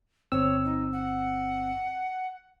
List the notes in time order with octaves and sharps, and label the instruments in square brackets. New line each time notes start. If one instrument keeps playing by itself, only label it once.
[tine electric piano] G1 C4 E6 [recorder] C#5
[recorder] D#4
F#5